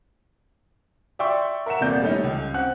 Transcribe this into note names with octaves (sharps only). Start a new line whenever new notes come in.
D5 E5 G5 C6 C#6 E6
A#4 E5 F#5 E7
D#1 C3 A#3 B3 D5 G6
G3 A3 C#4 D#4
C#2
C4 F#5 F#6